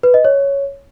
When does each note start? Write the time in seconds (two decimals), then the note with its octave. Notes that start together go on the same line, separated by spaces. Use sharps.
0.03 B4
0.14 D#5
0.25 C#5